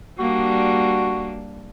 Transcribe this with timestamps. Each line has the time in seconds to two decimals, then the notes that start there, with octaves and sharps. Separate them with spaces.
0.19 G3 A#3 D4 F#4